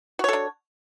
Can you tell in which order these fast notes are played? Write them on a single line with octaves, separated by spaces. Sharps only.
F#4 C#5 A4 D4